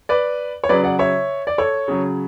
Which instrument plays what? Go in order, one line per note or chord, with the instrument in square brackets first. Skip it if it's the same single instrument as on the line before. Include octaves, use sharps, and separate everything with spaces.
[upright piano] B4 D5
C#5
C#3 F#3 B4 D5
D5 F#5
C#5 E5
D5
A4 C#5
C#3 F#3